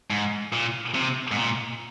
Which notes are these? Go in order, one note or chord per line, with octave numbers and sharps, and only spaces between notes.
G#2
A#2
C3
G#2
A#2